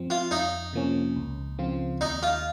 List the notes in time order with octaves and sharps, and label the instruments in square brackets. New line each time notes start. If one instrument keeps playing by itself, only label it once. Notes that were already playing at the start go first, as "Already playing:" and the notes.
Already playing: [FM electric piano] F#2 F3 C4
[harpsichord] F4
[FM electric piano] F2 [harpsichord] D#4
[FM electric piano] C3 F3 A#3 C#4
C#2
C#3 F3 C4 F4
[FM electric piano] D#2 [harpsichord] D#4
[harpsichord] F4